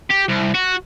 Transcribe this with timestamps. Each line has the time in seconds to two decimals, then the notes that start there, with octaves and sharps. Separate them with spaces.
0.11 G4
0.29 C2
0.55 F#4